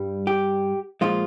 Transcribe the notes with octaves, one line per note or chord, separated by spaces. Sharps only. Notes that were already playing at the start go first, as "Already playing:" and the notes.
Already playing: G2 G3
G4
A#2 F3 G#3 F4